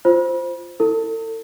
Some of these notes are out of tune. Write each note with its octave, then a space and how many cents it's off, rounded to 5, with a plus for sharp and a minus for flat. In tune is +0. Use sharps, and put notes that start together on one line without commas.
F4 +0 C5 +0
E4 +0 A4 +40